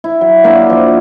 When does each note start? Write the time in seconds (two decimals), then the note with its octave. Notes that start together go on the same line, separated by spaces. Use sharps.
0.04 E4
0.21 F#3
0.44 A#3 D4 E4 D5
0.70 F3